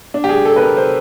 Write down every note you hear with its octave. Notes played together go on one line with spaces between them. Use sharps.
D4
G4
G#4
A4
B4
A#4
C5